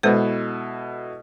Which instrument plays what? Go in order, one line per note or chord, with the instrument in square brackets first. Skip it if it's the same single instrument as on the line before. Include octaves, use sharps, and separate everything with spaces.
[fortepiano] B2 E4 A4 [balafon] G#3 B4 C5